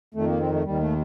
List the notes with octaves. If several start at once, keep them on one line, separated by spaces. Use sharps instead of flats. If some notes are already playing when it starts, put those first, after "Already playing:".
F2 D#3 A3
A#3
C4
A3
D#2 D#3 G3
A3